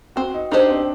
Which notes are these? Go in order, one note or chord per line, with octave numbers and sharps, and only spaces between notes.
C4 F#4
D#4
D4 D#4 G4 C5 D#5
C4